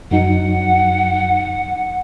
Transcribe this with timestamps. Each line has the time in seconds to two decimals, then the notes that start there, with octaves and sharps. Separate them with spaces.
0.11 F#2 F#3 D#4 F#5